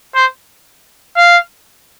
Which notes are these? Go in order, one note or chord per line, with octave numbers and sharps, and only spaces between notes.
C5
F5